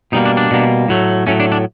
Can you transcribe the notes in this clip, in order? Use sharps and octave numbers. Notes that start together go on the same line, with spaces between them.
B2 G3 A#3 D#4
D4
D4
B2 G3 A#3
A2 F#3 A3
A2 F#3 A3 C#4
D4
D4